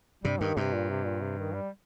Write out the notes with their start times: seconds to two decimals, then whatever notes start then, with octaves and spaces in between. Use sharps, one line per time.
0.24 G2 C3 G3
0.40 G2 D#3
0.57 G2 C3
0.73 A#2
0.89 C3
1.05 A#2
1.21 C3
1.38 D#3
1.54 G3